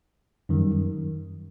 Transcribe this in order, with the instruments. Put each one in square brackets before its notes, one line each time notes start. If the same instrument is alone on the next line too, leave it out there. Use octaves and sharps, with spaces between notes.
[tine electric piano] F#2 D#3 G3